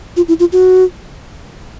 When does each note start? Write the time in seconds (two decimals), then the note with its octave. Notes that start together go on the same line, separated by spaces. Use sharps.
0.16 F4
0.28 E4
0.40 F4
0.52 F#4